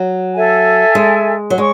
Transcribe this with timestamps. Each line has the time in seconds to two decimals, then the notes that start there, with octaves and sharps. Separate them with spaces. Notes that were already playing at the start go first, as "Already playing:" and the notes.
Already playing: F#3
0.32 A4 E5 G#5
0.95 G#3
1.50 F#3
1.57 G#3 C#6